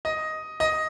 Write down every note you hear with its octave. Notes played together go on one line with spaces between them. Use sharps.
D#5
D#5